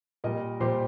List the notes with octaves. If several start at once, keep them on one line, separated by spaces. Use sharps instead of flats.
A#2 G3 A#4 D#5
A#2 G3 G4 C5